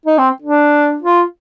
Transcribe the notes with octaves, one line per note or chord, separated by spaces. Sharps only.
D#4
C4
D4
F4